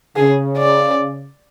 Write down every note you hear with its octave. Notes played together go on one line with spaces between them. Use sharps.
C#3 G#4
D5